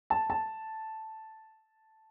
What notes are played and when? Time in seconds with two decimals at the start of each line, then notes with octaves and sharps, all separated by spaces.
0.10 A5
0.30 A5